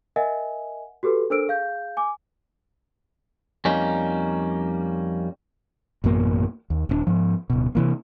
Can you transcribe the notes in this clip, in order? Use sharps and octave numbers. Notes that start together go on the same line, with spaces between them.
A#4 D#5 E5 F#5 G#5
F#4 G4 A4 B4
D4 A4 A#4 C5 E6 D7
G#4 F5 G6
G#5 D6
F2 G3 A#3 C#4 D#4
A1 F#2 B2 A#3
D#2
D#1 C4 D4
G#2 F3
D1 B2
C3 E3 A#3